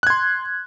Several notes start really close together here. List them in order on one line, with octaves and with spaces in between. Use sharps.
F#6 G#6 C6